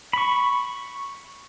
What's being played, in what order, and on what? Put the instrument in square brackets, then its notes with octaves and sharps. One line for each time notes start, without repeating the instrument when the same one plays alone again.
[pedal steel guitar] B5 C#6